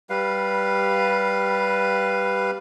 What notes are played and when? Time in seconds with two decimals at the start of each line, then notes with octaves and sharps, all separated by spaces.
0.10 G3 B4 F5